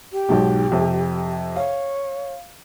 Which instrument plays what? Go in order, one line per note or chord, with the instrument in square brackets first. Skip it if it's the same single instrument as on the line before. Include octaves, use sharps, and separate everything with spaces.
[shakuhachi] G4
[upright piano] B1 G#2 B2
F2 C3
[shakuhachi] C#5 [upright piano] F5